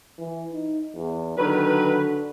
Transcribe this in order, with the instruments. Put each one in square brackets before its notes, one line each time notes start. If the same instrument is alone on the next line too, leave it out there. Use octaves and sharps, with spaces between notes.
[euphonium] E3
D#4
E2
[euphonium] D3 [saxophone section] D#3 F#3 B4